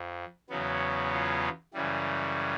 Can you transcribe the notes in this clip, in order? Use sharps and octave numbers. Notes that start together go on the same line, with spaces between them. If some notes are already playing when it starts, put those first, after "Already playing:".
Already playing: F2
E2 C#3 F#3 B3
F4
F#2 C#3 E3 G3